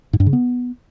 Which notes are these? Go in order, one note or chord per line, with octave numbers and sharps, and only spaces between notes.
G#2
G2
C#3
B3